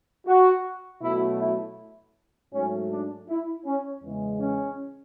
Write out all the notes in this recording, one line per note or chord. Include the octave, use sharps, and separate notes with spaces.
F#4
B2 F#3 A3 E4
E4
G#2 F#3 A3 C#4
D4
E4
C#4
E2 C#3 E3 G#3
C#4